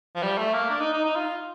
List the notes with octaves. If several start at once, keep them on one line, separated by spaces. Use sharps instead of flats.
F3
G3
A3
A#3
D4
D#4
D#4
D#4
F4